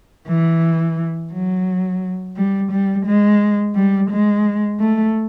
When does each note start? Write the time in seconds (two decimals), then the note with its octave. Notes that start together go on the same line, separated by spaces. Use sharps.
0.28 E3
1.32 F#3
2.36 G3
2.71 G3
3.06 G#3
3.75 G3
4.10 G#3
4.79 A3